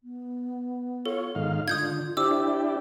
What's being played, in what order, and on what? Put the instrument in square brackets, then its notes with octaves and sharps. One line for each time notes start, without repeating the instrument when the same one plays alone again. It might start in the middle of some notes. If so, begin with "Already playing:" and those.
[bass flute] B3
[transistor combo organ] F4 C#5 [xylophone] A4
[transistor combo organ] G#2 D#3 F5
[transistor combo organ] D3 [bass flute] F4 [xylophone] D#6 G6 G#6
[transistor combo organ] D4 E4 G4 [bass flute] C5 [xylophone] D6 E6